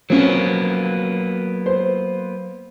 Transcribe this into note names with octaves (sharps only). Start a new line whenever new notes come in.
F3 F#3 A#3 B3 C#4
C5